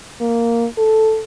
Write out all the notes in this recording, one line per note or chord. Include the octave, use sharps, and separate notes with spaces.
A#3
A4